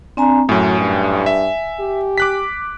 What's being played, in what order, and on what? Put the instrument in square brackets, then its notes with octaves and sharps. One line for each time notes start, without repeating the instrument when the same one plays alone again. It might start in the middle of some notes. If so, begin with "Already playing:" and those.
[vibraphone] C4 G#5 A#5 [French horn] D4
[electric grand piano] F#2 A2 [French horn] F#3 [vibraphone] G#5
[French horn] G2
[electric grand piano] E5
[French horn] G4
[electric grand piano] D6 F#6 B6